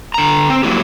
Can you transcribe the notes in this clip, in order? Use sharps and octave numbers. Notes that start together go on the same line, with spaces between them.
D3 A#5
C4
F#3 A#3 E4 G4